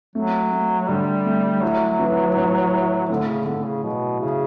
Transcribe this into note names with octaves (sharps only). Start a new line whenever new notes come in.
F#3 A3
A3
D3 G3
A3
F#3 E4
E3
A2
E4
A2 D3
C#3
A2 D3
C#3
B2 F#3
C#3 E4